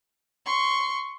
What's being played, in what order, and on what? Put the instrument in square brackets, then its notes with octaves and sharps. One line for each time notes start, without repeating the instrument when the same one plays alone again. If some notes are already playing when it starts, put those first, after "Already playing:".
[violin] C6 C#6